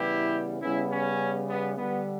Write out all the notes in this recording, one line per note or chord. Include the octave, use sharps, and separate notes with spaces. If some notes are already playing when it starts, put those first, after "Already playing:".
Already playing: C#3 E3 G3 B3 E4 G4
C#3 G3 B3 C#4 E4
C#4
B3
D3 G3 B3